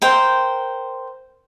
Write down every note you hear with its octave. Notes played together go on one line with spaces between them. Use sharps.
A#4 C5 G5